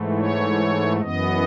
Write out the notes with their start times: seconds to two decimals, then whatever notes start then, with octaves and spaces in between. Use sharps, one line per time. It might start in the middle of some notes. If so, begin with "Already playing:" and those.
Already playing: G#2 E3 A3
0.18 C#5
1.01 F#2 E3 B3 D#5